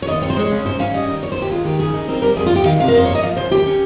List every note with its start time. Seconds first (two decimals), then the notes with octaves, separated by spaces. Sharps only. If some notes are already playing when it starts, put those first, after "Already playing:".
0.02 C#5
0.07 D#2 D#5
0.22 C4 C#5
0.30 C5
0.36 G#3 C#5
0.51 C#3
0.65 G#2 C5
0.79 C#4 F5
0.94 G3 D#5
1.08 D#3
1.22 D#2 C#5
1.32 C5
1.37 D#2
1.42 G4
1.51 G#3 F4
1.65 D#3 G4
1.79 C#3 G#4
1.94 D#4
2.08 C4 A#4
2.22 G3 A#4
2.37 F2 G#4
2.47 F4
2.51 F2 G4
2.65 D#3 F5
2.80 C3 F5
2.88 A#4
2.94 F2 C5
3.06 A#3 C#5
3.15 D#5
3.23 F3 F5
3.37 C#3 C5
3.51 D#2 G4
3.66 C#4